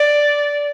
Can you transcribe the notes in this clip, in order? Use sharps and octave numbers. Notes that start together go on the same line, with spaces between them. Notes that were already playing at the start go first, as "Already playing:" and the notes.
Already playing: D5